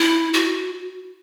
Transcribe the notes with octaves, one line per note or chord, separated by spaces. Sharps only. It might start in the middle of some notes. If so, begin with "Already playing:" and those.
Already playing: E4
F#4